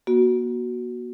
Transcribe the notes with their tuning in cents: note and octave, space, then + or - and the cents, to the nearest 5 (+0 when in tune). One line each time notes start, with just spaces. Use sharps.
A#3 +45 F#4 +0